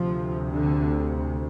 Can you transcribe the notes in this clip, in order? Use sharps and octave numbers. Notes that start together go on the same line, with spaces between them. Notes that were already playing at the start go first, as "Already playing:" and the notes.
Already playing: D2 C3 F3
D3